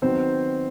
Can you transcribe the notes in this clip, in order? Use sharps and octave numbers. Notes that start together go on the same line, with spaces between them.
D#3 F#3 B3 C4 C5